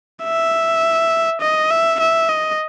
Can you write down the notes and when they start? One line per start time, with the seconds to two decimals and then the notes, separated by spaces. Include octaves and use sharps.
0.24 E5
1.41 D#5
1.71 E5
2.00 E5
2.29 D#5